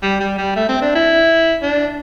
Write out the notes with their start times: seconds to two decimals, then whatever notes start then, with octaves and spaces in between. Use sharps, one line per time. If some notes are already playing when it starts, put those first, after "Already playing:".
0.03 G3
0.20 G3
0.38 G3
0.56 A3
0.69 C4
0.82 D4
0.95 E4
1.63 D4